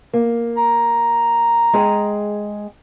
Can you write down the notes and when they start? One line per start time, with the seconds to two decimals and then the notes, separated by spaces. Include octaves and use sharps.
0.13 A#3
0.57 A#5
1.73 G#3 G#4 G5